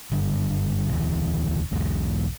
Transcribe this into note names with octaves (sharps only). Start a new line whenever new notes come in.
F#1 G2 D3
E1 D2 E3
B1 E2 G#2